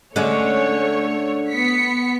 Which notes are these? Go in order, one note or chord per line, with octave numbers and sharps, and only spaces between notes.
D3 G#3 A3 C#4 C#5
B3 B6 C#7